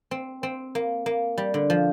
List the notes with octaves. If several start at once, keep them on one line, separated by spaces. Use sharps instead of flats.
C4
C4
A#3
A#3
G3
D3
F3